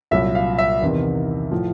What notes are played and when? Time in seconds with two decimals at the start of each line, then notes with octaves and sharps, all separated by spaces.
0.11 C2 A#2 F#3 E5
0.35 F5
0.58 E5
0.82 E2 C3 D#3
1.52 A2 F3